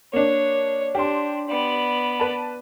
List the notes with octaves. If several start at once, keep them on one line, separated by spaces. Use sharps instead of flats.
A#3 D4 C#5
D4 G4 C6
B3 D5
B4 A5